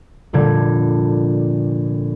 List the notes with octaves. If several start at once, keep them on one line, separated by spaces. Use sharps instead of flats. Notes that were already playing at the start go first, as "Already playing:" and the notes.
F1 A#2 D3 G3 G#6